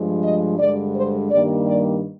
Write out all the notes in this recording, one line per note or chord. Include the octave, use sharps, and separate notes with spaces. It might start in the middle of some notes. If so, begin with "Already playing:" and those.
Already playing: G2 F3 G#3
D#5
G2 D3 G#3 D5
C5
G2 D#3 G3 A#3 D5
D5